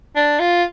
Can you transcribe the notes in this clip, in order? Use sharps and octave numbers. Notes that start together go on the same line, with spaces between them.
D4
F4